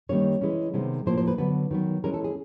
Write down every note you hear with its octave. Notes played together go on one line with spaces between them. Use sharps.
D#3 G3 A#3 C#4 C#5
E3 G#3 C#4
C3 D#3 G#3 B3
A2 F3 A#3 C5
C5
B4
D3 F#3 B3 B4
D#3 F#3 B3
E3 G#3 C#4 A#4
A4
G#4